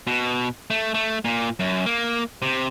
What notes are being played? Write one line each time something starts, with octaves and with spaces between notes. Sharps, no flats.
B2
A3
A3
A#2
F#2
A#3
C3